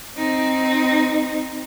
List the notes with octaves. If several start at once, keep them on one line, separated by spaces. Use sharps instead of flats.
C4 D#4